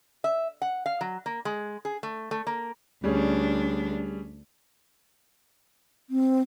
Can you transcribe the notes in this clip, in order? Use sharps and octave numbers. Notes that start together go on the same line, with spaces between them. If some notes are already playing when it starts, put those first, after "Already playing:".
E5
F#5
F5
F#3
A#3
G#3
G#4
A3
A3
A#3
D2 G3 C#4 D4 G#4
C4